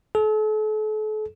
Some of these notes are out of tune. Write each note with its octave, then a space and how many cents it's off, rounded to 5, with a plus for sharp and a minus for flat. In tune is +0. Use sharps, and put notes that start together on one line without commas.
A4 -40